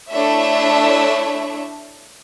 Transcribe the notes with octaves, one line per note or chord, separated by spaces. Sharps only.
A3 D4 E4 A4 C#5 E5